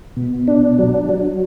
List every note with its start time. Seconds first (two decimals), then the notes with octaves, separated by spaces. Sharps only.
0.17 B2
0.48 D4
0.79 F#3
1.09 F#3